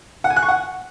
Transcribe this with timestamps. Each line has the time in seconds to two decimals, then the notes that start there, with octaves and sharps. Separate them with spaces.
0.24 F#5
0.30 G#5
0.36 F#6
0.42 C#6
0.48 F#5